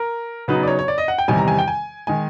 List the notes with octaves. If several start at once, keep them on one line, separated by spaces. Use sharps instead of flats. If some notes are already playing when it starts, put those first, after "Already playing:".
Already playing: A#4
C#3 F#3 B3 D#4 B4
D5
C#5
C#5
D5
D#5
F#5
G5
E2 C3 D#3 G3 G#5
A#5
G#5
G5
G#5
D#3 G#3 G#5